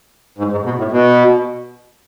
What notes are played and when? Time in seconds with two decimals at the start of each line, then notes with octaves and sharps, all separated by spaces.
0.38 G#2
0.51 G#2
0.65 B2
0.78 A2
0.91 B2